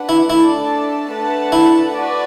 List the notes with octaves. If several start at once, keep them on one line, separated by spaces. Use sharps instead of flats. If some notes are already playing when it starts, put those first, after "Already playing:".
Already playing: D4 B4 F#5
E4
A3 D4 E4 A4 D5 A5
A3 D4 B4 F#5 A5
E4
F#4 B4 D5